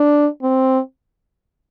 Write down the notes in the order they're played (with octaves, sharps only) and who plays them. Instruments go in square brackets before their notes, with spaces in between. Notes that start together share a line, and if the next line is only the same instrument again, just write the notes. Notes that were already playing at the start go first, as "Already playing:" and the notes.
Already playing: [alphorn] D4
C4